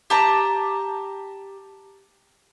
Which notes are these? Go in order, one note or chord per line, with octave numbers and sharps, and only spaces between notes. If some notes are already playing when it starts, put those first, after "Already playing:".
G4 A5 A#5